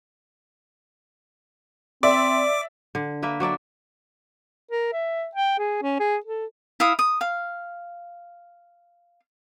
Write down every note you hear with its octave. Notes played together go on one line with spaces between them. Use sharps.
C4 D5 E5 D6
D3
A#3 B4 E5
F#3 D4 D5 E5
A#4
E5
G5
G#4
C#4
G#4
A4
E4 F5 D#6
D#6
F5